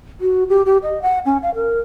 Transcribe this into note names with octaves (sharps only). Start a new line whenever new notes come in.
F#4
G4
G4
D#5
F#5
C#4
F5
A#4